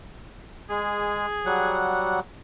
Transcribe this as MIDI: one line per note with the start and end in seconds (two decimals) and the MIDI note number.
0.70 1.26 56
0.70 1.92 68
1.46 2.20 54
1.46 2.20 55
1.46 2.20 78